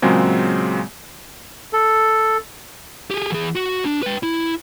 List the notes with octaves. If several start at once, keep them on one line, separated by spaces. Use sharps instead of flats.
A#2 C#3 F#3 G#3 C4
A4
G4 G#4
E3 G#4
F#4
D4
B4 G5
E4